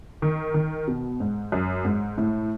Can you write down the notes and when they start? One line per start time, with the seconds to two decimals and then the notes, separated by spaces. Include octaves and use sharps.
0.22 D#3
0.54 D#3
0.87 B2
1.20 G#2
1.52 F#2
1.85 G#2
2.17 A2